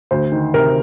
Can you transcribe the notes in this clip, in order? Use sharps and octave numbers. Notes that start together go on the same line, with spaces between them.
D2 C5
D#3
C3 A#4